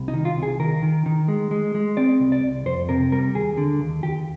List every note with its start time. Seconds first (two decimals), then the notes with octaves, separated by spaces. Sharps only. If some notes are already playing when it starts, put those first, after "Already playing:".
Already playing: C2
0.08 D#4
0.14 D#3
0.25 F4
0.36 C2
0.43 G#4
0.60 D#3 A#4
0.82 D#3
1.06 D#3
1.28 G#3
1.51 G#3
1.75 G#3
1.97 C4 D5
2.20 C2
2.32 D5
2.43 C2
2.66 F2 C5
2.89 C3 A#4
3.12 G3 A#4
3.35 D#2 G#4
3.58 D3
3.80 D#2
4.03 D#2 G4